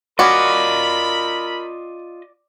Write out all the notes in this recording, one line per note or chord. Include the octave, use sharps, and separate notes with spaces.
C#4 F4 F#4 A#4 D5 D#5 B5